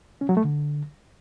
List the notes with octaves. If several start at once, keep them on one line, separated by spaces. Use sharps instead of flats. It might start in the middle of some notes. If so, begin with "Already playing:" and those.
C#4
F#3
A3
D3